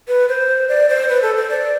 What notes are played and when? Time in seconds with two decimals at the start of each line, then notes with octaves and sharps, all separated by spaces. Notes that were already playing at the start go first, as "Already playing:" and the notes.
0.08 B4
0.29 C5
0.69 D5
0.89 C5
1.09 B4
1.22 A4
1.36 C5
1.49 D5